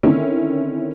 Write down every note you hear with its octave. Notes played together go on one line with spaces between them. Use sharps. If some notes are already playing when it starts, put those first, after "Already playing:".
D3 D#3 C4 C#4 E4